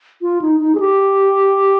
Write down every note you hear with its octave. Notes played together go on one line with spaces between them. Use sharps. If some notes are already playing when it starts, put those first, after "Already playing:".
F4
D#4
D#4
G#4
G4